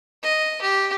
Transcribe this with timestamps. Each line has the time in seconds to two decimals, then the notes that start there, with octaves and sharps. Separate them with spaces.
0.23 D#5
0.62 G4